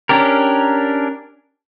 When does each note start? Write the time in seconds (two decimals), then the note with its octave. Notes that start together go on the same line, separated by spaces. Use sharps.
0.09 C#4 D4 G4 A#4